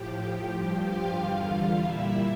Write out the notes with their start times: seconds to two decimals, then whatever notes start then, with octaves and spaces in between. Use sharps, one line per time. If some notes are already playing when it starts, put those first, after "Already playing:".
Already playing: A2 F3 G4 G5
0.52 G2 F3 G4 G5
0.85 F4 F5
1.17 E2 D3 G3
1.82 A#2 G3 E4 E5